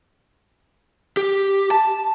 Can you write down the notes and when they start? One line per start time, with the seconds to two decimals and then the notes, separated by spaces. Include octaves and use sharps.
1.17 G4
1.71 A5